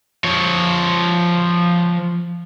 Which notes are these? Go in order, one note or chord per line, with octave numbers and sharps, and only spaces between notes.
F3 C#5